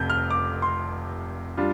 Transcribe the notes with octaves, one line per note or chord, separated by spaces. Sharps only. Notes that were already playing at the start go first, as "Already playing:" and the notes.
Already playing: F1 F2 C3 G6
F6
D6
C6
G3 D4 F4